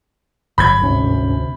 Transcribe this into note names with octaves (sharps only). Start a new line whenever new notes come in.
G1 F#3 B5 G6 G#6
G1 D2 G#2 C3 C#4